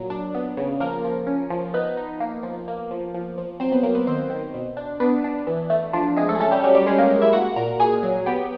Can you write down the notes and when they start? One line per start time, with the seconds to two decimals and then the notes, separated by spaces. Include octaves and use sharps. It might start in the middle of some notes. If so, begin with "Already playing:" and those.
Already playing: A#2 F#3
0.10 D4
0.35 B3
0.57 C#3
0.80 F3 A#3 A#4
1.05 F3
1.27 C#4
1.50 F3
1.74 B3 D#4 B4
1.97 D#4
2.20 A#3
2.43 F3
2.68 A#3
2.91 F3
3.14 F3
3.38 F3
3.60 F#3 C4 C5
3.72 B3 B4
3.83 F#3 A#3 A#4
3.95 B3 B4
4.07 D#3 C4 C5
4.30 D#3
4.54 B2
4.77 D4
5.00 B3 D4 B4
5.24 D4
5.47 E3
5.70 A3
5.93 F3 D4 F4
6.16 C3 G#3 G#4
6.29 A3 A4
6.35 G#4
6.40 A3 C#4 A4
6.51 G3 G4
6.64 F#3 C#4 F#4
6.75 G3 G4
6.86 G#3 C#4 G#4
6.98 A#3 A#4
7.10 G#3
7.22 E4 E5
7.33 A#3 F#4 F#5
7.56 A#2 A#4 A#5
7.80 A#2 G#4 G#5
8.03 F#3
8.26 B3 G4 G5